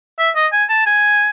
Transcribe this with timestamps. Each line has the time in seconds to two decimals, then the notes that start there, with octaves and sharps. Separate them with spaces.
0.19 E5
0.35 D#5
0.52 G#5
0.69 A5
0.86 G#5